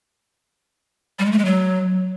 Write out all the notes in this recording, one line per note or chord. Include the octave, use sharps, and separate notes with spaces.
G3
G#3
A3
G#3
F#3